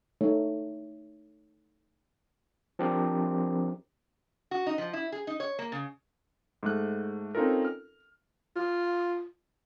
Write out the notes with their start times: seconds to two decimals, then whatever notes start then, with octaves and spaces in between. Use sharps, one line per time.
0.21 A3 D#4 C#5
2.79 F3 C4 D4 G4 A#4
4.51 F#4
4.66 D#4
4.78 F3
4.93 E4
5.12 G#4
5.27 D#4
5.40 C#5
5.59 A#3
5.72 C#3
6.63 G#2 A3 F#6
7.35 C4 C#4 D#4 F4 A4 A#4
7.65 F6
8.56 F4